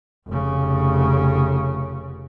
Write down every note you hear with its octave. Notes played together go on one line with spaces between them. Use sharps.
F1 C#3